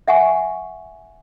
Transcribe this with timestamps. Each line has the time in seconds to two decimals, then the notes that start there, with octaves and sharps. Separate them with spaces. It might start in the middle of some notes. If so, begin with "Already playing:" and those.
0.08 E5 F#5 G#5 C#6